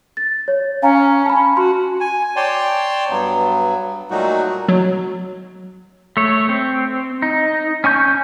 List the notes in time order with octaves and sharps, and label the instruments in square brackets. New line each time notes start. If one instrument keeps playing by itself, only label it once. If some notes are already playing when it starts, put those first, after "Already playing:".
[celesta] A6
C#5
[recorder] C#4 [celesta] F5 G#5 A#5
[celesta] A5 B5
[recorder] F#4 [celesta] C6
[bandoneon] G#5
C#5 D5 G5 A5 C6
G2 F#3 B3
A#2 F#3 G3 A3 D#4 F#4
[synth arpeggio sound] F#3
[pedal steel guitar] A3 C#5
C4
D#4
C#4 G#5 C#6 G6